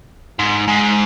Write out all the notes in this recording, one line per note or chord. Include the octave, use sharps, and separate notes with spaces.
G#2
G#2